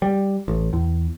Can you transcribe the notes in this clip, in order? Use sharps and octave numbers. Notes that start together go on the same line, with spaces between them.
G3
A1
E2